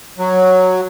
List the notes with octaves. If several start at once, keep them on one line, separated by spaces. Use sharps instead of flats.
F#3